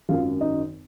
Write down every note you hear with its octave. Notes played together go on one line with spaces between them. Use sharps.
G#1 F#2 D#3 F4 F5
D#4 D#5